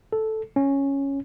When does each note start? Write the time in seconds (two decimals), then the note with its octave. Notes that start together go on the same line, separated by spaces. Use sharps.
0.13 A4
0.56 C#4